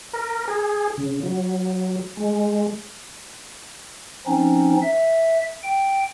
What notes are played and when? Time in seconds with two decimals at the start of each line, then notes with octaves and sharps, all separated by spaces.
0.13 A#4
0.48 G#4
0.97 C#3
1.23 F#3
2.17 G#3
4.27 F3 C4 C#4 D#4
4.82 E5
5.63 G5